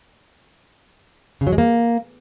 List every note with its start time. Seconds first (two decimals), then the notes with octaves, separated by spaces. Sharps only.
1.41 C#3
1.47 F#3
1.52 G#3
1.58 A#3